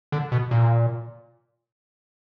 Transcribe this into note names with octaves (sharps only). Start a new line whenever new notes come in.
D3
B2
A#2